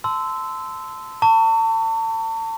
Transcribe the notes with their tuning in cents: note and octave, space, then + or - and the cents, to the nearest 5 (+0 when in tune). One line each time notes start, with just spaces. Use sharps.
A5 +0 C6 -20 E6 -10
A5 +35 C#6 +30